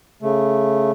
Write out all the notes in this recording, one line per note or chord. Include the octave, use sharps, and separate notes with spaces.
C#3 A3